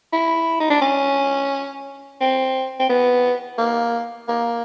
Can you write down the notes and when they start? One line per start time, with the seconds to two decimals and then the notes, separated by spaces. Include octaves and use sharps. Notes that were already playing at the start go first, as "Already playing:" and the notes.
0.13 E4
0.60 D#4
0.70 D4
0.81 C#4
2.20 C4
2.80 C4
2.89 B3
3.58 A#3
4.28 A#3